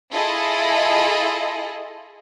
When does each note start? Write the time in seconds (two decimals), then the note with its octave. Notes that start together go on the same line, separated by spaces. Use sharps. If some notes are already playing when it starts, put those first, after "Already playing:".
0.13 E4 F4 G#4 A4 D#5